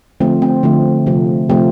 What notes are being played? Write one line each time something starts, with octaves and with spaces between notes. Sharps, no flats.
D3 F3 A3 C4
C4
D3 F3 A3
C3 F3 A3
C3 F3 A3 C4